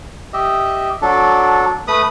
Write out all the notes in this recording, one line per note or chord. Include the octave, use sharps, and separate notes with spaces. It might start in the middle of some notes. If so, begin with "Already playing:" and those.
G4 D#5 E5
F#3 D4 A4
A3 B4 B5 D#6